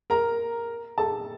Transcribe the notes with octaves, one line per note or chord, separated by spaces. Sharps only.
A#4 A#5
A4 A5